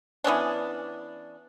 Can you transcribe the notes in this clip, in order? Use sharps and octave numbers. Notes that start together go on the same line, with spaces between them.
E3 B3 C#4 D4